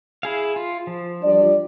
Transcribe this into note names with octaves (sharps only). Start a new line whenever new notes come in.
E4 G#4 F5
F4
F3
G3 D4 D5